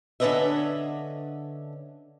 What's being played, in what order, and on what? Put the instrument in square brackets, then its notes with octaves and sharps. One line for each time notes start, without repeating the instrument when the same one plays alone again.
[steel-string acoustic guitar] D3 C#4 D4 B4 D#5 E5